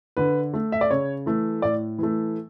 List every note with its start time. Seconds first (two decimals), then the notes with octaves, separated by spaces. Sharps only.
0.17 D3 B4
0.54 A3
0.72 E5
0.81 D5
0.90 C#3 C#5
1.26 E3 A3
1.62 A2 D5
1.99 E3 A3